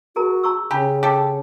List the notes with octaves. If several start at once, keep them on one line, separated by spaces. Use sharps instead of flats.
F#4 G#4 A#4 A#5
A#5 C#6 E6
C#3 G4 G#5 A#5 B5
G4 A4